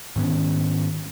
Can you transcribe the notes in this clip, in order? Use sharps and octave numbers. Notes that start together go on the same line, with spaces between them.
G#2 D#3 B3 C#4